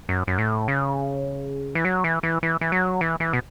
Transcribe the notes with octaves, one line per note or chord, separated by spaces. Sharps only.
F#2
F#2
A2
C#3
E3
F#3
E3
E3
E3
E3
F#3
E3
E3
B2